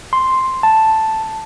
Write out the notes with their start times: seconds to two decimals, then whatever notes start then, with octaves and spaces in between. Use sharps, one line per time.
0.13 C6
0.63 A5